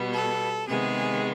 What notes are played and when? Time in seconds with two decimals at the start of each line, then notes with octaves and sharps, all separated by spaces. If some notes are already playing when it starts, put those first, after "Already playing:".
Already playing: B2 G3 B3
0.12 A4
0.67 C3 D#3 G#3 B3 G#4